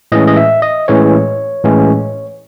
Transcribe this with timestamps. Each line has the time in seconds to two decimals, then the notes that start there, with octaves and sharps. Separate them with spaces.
0.12 A2 E3 G#3 C#4 D#5
0.27 D#5
0.37 E5
0.62 D#5
0.88 A2 E3 G#3 C#4 C#5
1.64 A2 E3 G#3 C#4